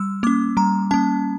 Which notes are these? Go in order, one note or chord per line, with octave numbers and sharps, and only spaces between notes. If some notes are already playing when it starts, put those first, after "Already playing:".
Already playing: G3 E6
A#3 C#4 D6
G3 A#5
A#3 C#4 A5